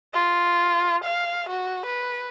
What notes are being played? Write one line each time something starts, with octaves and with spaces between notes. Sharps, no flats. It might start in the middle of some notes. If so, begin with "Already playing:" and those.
F4
F5
F#4
B4